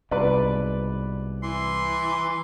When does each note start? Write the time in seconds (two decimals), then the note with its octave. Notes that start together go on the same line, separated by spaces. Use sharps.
0.11 C2 G#2 B2 B4 D5
1.43 E3 C6